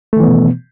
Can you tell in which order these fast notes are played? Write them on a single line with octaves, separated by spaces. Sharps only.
A3 D#3 E3 B3 B2